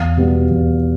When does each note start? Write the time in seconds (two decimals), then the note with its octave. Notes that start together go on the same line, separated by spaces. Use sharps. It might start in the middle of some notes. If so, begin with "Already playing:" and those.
Already playing: E2 F5
0.17 B2 G3 B3
0.50 E2